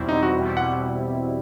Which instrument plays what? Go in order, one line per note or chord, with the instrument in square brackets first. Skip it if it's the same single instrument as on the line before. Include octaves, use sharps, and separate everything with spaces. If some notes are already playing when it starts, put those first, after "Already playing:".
Already playing: [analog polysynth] E2 B2 G3 C4 E4
[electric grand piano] D#4
F#4
[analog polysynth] E2 B2 G3 C4 E4
[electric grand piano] F#5